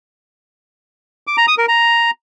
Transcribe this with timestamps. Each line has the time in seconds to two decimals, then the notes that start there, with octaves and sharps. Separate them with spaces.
1.27 D6
1.37 A#5
1.48 D#6
1.58 A#4
1.68 A#5